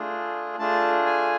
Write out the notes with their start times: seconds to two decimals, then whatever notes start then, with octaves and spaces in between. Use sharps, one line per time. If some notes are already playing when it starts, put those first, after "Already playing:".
Already playing: A3 D4 F4 G#4
0.59 A3 D4 F4 G#4 A5
1.06 G#5